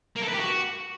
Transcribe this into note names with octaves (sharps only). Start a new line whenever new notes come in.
A#3
A4
B4
G4
F#4